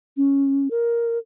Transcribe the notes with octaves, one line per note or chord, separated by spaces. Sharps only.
C#4
A#4